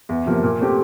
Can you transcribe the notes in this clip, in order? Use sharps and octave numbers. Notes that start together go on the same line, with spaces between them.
E2
C3 F3 A#3
A#2
A3 C4 G4